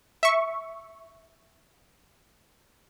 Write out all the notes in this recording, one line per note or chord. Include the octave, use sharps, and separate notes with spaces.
E5 C#6